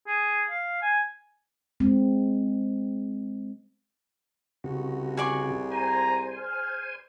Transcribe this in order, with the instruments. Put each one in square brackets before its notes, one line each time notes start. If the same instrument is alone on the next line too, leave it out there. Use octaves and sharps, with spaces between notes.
[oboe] G#4
F5
G#5
[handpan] G#3 C4
[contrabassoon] C2 [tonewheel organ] C#3 F#4
[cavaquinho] G#4 D5 C#6
[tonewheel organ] C5 G#5 [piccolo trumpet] A#5
[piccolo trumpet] F6